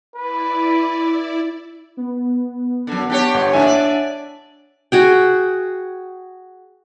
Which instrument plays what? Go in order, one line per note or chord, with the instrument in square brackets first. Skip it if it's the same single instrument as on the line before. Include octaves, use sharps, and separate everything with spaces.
[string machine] E4 D5 [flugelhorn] B4
[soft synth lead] B3
[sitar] F#2 D3
D4 G4 C#5
[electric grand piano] G1 [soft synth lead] F#5
[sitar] A2 A#3 [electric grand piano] D4 E5 G#5
[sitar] D5
[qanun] F#4 G#4 G5